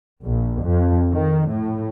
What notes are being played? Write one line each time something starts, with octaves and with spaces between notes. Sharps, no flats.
A#1
F2
D#3
A2